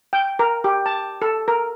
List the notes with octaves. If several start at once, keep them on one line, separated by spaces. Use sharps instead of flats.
G5
A#4
G4
A5
A4
A#4